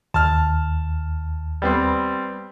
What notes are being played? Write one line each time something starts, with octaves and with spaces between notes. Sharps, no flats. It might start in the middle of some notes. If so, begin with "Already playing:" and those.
D#2 A5 F6
G3 B3 C4